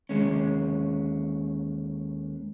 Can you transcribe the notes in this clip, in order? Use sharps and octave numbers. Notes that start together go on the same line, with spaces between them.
D#2 G#3 C#4